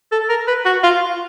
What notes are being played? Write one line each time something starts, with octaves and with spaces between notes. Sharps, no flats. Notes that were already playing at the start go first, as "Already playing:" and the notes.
A4
A#4
B4
F#4
F4